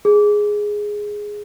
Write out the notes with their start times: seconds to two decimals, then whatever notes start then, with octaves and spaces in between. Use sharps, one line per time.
0.05 G#4